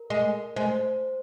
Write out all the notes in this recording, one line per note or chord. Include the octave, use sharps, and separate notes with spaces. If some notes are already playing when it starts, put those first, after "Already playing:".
Already playing: A#4
G#3
G#3 C5